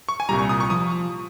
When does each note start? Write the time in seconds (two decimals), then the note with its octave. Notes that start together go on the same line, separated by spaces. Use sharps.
0.09 C#6
0.20 G#5
0.29 C2 A#2 G3 A#5
0.39 C#6
0.49 D#6
0.60 C#6
0.70 F3 D#6